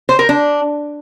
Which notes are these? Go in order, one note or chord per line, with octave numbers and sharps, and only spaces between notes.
C5
A#4
D4